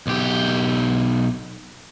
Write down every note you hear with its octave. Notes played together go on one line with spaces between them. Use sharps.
B1 G4